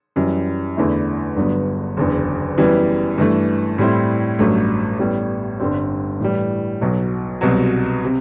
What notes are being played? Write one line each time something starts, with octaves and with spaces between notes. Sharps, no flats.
F#2 E3 G3
E2 D3 A3 E4
G1 G2 D3 F#3 B3
F#1 E2 D3
F#2 E3 G3 B3
G2 E3 A3
A2 G3 C4 E4
A1 G2 F#3 A3
A1 A2 G3 B3
G1 G2 D3 G3 C4
A2 E3 G3
B1 B2 F#3
C2 B2 F#3
C3